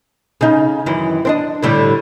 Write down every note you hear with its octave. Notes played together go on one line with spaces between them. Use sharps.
C#3 D#4
F#2 D#3 E3
C4 D4 D#5
A2 D3 G3